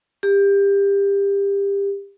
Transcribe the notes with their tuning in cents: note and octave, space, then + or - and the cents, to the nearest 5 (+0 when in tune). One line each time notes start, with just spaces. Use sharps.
G4 +25